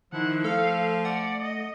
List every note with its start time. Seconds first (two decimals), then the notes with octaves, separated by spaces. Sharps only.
0.13 D#3 F3 E4 F#5
0.44 A3 A4 F5
1.05 D5 F#5
1.42 D#5